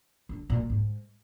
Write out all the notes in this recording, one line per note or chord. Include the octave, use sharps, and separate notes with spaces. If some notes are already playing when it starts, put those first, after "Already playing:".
D3
A#2
G#2